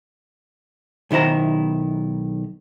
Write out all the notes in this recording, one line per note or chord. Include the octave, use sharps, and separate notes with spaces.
B1 D#3 E4 C5 A#5